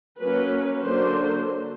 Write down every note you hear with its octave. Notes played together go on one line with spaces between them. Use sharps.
F#3 A#3 C#4 B4
D3 F#3 A#3 D4 C5